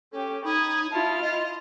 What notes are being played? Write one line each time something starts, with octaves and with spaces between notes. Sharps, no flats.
C#4 G4 A4
D#4 B5 D#6 G#6
E4 F4 A5 F6
D#5